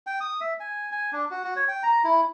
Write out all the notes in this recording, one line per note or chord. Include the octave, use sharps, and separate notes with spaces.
G5
D#6
E5
G#5
G#5
D4
F#4
F#4
C#5
G5
A#5
E4